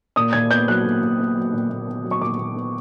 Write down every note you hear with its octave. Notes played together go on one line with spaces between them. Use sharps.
A#2 D#6
A#2 G#6
B3 G6
F#3 F#6
A#2
A#2
B3
F#3
A#2
A#2
B3
F#3
C#6
A#2 D6
A#2
B3